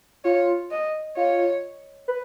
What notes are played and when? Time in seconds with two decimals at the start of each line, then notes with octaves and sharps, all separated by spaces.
0.25 F4 C#5
0.71 D#5
1.17 F4 C#5
2.08 B4